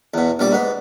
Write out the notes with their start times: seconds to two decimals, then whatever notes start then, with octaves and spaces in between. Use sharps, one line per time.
0.14 E2 B2
0.39 A#1 G3 D5
0.52 G#2 B3